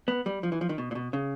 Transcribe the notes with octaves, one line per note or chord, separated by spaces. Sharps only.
B3
G3
F3
E3
F3
D#3
B2
A#2
B2
C#3